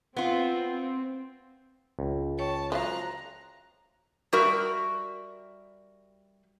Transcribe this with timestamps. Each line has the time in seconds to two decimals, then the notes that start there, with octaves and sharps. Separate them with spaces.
0.16 B3 C4 F4
1.99 C#2
2.39 C#5 G5 A5 C#6
2.72 F3 F#3 F5 A#5 F#6
4.33 G3 F#4 A#4 E5